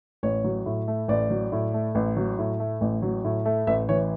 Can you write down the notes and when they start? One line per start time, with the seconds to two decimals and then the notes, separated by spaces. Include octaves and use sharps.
0.23 A1 C#5
0.44 F#3
0.66 A2
0.88 A3
1.08 A1 D5
1.30 F#3
1.52 A2
1.74 A3
1.95 A1
2.17 F#3
2.39 A2
2.60 A3
2.81 A1
3.02 F#3
3.25 A2
3.45 A3
3.67 A1 E5
3.89 E3 C#5